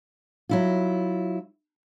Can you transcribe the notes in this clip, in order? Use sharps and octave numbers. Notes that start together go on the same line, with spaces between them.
F#3 E4 F4